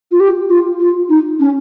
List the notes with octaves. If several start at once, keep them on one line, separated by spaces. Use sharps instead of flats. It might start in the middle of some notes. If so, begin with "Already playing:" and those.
F4
G4
F4
F4
D#4
C#4